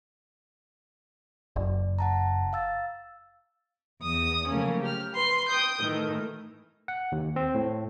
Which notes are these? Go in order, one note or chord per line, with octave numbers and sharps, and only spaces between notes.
F#1 D5
F#5 A5 A#5
F5 E6 A6
E2 D#6
C#3 F3 F#3 A3 A#3 C#4
G4 F6
B4 C6
G5 D#6 G6
A2 D#3 E3 A3
F#5
D#2
C4
A2